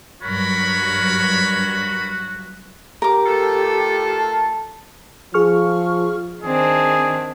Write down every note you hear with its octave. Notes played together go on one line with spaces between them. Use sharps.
G2 F#3 F#4 A#4 C#5 B5
G4 A#4 D6
A3 F4 A4
A5
F3 G#4 C#6 F6
D#3 C4 D4 G#4